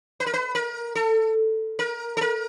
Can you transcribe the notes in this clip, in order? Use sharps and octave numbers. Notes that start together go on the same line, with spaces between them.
B4
A#4
B4
A#4
A4
A#4
A4
A#4